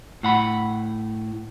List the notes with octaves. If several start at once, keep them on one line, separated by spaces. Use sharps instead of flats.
A2 F#5 B5